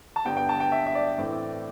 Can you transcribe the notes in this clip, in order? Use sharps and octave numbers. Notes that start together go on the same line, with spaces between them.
A5
G2 D3 G3 B3 G5
G5
A5
G5
E5
E5
D5
A2 E3 A3 C4